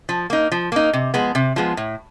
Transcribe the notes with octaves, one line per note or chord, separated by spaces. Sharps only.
F3
A#3 D#4
F3
A#3 D#4
C3
F3 G#3 B3
C3
F3 G#3 B3
A2